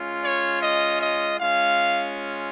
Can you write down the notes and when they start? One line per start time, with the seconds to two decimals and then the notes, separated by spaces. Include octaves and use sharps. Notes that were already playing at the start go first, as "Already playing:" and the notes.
Already playing: G#3 C#4 F4
0.23 C#5
0.62 D#5
1.00 D#5
1.39 G#3 C#4 F4 F5